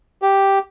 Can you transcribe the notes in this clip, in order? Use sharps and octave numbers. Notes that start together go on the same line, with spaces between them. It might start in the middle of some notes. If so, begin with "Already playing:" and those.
G4